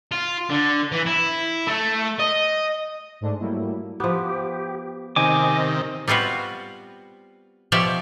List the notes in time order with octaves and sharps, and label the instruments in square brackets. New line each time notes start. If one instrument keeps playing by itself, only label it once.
[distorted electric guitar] F4
D3
E3
E4
A3
D#5
[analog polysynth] G#2 G#3 A3 D4
F#3 G3 A3 A#3 E4
[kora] F3 B3 [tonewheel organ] G4
[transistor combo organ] C3 D#3 [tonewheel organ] D#5 [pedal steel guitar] G#5 D6
[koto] G3 B3 C4 F4 F#4
B2 F3 G4 C#5 D5 E5